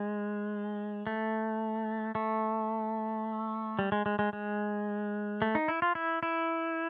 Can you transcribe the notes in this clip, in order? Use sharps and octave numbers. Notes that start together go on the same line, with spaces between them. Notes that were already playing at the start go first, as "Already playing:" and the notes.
Already playing: G#3
A3
A3
G3
G#3
G#3
G#3
G#3
A3
D#4
E4
F4
E4
E4